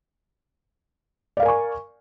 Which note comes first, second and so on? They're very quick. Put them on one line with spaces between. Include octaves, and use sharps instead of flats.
D5 F5 A#4 G#5 C#6